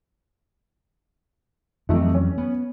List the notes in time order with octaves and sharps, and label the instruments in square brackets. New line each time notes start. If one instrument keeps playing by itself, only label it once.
[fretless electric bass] F2 E3 F#3 [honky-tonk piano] C3 A3 D#4
[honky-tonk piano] C#4
[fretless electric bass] B3